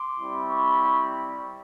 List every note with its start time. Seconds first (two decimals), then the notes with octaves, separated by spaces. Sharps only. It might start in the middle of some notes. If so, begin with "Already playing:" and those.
Already playing: C6 D6
0.17 G3 C4 E4
0.48 B5 C#6